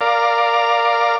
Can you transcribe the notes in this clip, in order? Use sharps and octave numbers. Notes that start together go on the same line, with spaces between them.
A#4 D5 F5